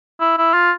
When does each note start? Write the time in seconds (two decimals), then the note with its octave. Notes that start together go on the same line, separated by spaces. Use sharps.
0.20 E4
0.38 E4
0.54 F4